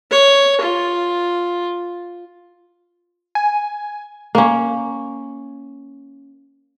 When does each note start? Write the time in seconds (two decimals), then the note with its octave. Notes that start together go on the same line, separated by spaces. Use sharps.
0.11 C#5
0.61 F4
3.35 G#5
4.35 A#3 C#4